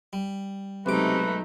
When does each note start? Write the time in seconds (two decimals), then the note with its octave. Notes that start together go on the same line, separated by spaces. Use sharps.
0.13 G3
0.86 B1 C3 G#3 A3 D#4 B4 D6